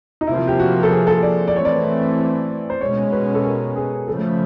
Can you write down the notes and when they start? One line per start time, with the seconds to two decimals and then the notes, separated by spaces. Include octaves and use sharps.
0.21 D#4
0.27 C3 F3 A#3 E4
0.48 G4
0.60 F#4
0.83 A4
0.91 G#4
1.07 A4
1.23 D5
1.48 D5
1.54 E3 A3 C4 C#5
1.65 D5
2.70 C5
2.80 B2 G#3 C#4 C#5
3.12 B4
3.34 A4
3.44 A#4
3.76 G#4
4.08 C#3 F3 A3 A4